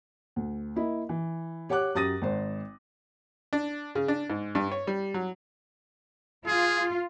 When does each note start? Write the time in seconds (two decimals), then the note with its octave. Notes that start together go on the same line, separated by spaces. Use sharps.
0.36 D2
0.76 A#3 E4 D#5
1.09 E3
1.69 G4 C#5 F#5 D6 F#6
1.95 F#2 G4 D#6 A6 A#6 D#7
2.22 G#1 C5
3.53 D4
3.95 C#3
4.08 D4
4.30 G#2
4.55 G2
4.72 C#5
4.87 G3
5.14 F#3
6.47 F4 G#4